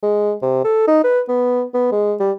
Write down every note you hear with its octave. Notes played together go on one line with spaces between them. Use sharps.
G#3
C3
A4
D#4
B4
B3
B3
G#3
G3